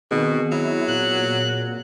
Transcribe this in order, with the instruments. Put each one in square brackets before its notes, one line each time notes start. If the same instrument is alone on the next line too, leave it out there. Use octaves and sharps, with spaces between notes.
[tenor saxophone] B2 [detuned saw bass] D#3 [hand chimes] B3 C4 G#4
[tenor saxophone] F#3 [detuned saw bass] E4
[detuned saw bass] A#2 [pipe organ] F#6